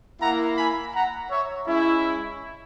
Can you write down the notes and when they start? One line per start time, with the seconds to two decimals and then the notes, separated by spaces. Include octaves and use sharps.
0.20 A#3 E4 F#5 A#5
0.57 G#5 B5
0.94 F#5 A#5
1.30 C#5 E5
1.67 G#3 C#4 E4